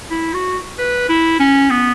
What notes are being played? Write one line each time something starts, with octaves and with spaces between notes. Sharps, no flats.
E4
F#4
B4
E4
C#4
B3